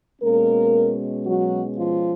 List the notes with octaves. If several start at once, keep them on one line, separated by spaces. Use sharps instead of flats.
B2 G#3 A#3 C#4 A#4
F#3 F#4
F3 F4